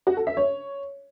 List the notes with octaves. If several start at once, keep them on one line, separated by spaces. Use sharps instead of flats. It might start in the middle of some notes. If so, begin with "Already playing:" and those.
F#4
A4
E5
C#5